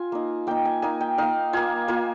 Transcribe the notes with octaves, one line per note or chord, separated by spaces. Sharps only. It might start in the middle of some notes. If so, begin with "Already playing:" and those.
Already playing: F4 G#5
A#3 D#4
A#3 D#4 G5
G#5
A#3 D#4 G#5
G5
A#3 D#4 F5
A#3 F4 G#5
A#3 F4 G#5